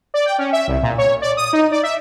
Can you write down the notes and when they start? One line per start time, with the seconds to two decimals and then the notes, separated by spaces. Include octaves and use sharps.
0.14 D5
0.26 G5
0.38 C#4
0.53 E5
0.68 C2
0.83 A#2
0.98 C#5
1.22 D5
1.37 D#6
1.53 D#4
1.72 D5
1.83 E5